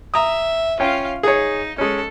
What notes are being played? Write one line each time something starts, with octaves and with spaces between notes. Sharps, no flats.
E5 A#5 D#6
C#4 F4 F5 G5
D#4 G#4 C#5
G#3 C#4 A4